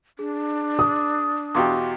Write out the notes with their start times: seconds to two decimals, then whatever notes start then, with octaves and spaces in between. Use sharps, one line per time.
0.19 D4 G#4
0.79 D#6
1.55 E2 B2 G4 F5 C6 D6